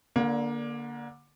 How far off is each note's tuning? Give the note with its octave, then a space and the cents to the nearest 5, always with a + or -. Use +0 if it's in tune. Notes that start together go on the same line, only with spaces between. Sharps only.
D3 -10 A#3 +20 D4 +0